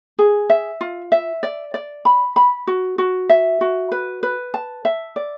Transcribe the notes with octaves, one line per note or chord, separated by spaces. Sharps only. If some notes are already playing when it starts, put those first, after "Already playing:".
G#4
E5
F4
E5
D5
D5
B5
B5
F#4
F#4
E5
F#4
B4
B4
A5
E5
D5